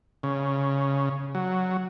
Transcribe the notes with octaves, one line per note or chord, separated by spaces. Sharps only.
C#3
F#3